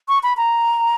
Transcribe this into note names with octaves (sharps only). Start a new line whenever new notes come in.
C#6
B5
A#5